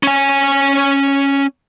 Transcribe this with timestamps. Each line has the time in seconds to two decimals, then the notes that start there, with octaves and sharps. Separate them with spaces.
0.03 C#4 G#5